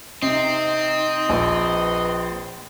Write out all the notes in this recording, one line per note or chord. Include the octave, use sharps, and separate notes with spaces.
C3 C4 D#4 D#5
A#1 B4